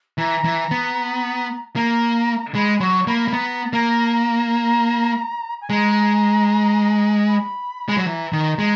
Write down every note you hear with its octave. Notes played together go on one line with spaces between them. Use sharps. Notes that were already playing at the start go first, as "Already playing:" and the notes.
E3 A#5
E3
B3
A#3 A#5
G#3 B5
F#3 C#6
A#3 B5
A#3
B3 A#5
A#3 A#5
A#5
G#5
G#3 A#5
B5
G#3
F#3
E3 A#5
D#3
G#3